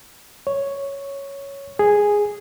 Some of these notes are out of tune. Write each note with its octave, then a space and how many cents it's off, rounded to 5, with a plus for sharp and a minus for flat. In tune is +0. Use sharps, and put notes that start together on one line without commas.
C#5 +0
G#4 -5